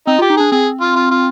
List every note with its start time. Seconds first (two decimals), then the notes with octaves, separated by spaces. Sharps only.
0.07 C4 D#4
0.19 F4 G4
0.30 D#4
0.37 D4 G#4
0.52 C4 G#4
0.81 F4
0.96 F4
1.11 F4